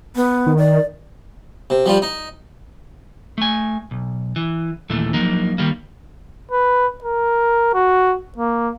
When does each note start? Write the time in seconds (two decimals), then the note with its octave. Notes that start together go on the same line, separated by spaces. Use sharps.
0.16 B3
0.46 D#3
0.58 D5
1.70 C3
1.86 F3 G3 F4
2.02 D#4
3.38 A3 G#5
3.91 B1
4.36 E3
4.89 D#2 A#2 E3 A3
5.13 F3 F#3 A#3 D#4
5.58 D#3 G3 A#3
6.51 B4
7.04 A#4
7.74 F#4
8.38 A#3